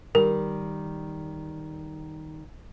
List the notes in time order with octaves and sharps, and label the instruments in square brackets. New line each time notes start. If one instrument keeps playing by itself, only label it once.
[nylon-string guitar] D#3 G3 [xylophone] A#4